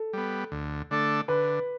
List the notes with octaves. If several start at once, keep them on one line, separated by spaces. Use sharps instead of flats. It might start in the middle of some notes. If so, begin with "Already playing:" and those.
Already playing: A4
G3 B3
D2
D3 A3 D4 A4
D3 B4